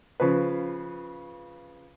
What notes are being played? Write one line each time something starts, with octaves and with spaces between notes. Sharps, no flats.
C#3 F3 B4